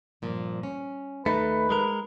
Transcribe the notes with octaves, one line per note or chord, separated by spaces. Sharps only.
G2 A#2 F3
C#4
D#2 A3 D#4 B4
G#3 A#4